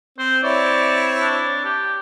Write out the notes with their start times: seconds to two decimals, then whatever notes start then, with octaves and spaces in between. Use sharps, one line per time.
0.18 C4 C5
0.44 C4 E4 C#5 D5
1.21 D4
1.65 G4